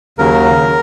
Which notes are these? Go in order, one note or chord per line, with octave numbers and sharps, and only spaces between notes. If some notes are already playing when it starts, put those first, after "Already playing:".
D#2 C#3 F#3 A#4